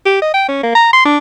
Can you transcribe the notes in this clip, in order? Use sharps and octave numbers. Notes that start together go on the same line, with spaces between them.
G4
D#5
G5
C#4
A#3
A#5
C6
D4